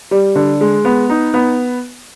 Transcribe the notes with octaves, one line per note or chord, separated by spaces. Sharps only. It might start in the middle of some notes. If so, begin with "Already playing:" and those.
G3
D3
G#3
B3
D#4
B3